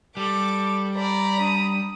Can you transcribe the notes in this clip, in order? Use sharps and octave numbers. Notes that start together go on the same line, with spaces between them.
G3 A4 D6
D5 A#5 B5
D4 D#6